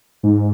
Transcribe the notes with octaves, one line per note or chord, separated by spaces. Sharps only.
G#2